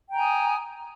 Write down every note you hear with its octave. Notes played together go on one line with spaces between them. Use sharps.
G5 G#5 A#5 D#6